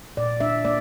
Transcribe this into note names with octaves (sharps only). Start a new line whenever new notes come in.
A#2 D5
D4 E5
A#3 D5